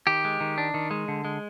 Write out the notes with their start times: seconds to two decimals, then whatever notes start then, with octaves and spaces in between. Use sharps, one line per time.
0.07 D#3 G4
0.25 G#3
0.40 D#3
0.58 D4
0.74 D#3
0.91 G#3
1.08 D3
1.25 G#3